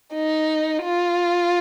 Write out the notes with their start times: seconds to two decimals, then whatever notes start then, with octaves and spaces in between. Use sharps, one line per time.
0.14 D#4
0.83 F4